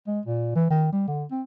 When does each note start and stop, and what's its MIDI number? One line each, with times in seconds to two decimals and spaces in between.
0.07 0.20 56
0.26 0.51 46
0.56 0.69 52
0.70 0.92 51
0.93 1.04 55
1.08 1.25 50
1.31 1.42 60